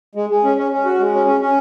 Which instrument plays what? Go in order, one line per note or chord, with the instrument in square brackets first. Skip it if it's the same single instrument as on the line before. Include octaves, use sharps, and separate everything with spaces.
[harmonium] G#3
G#3
C#4
C#4
C#4
F#4
G#3
C#4
C#4
C#4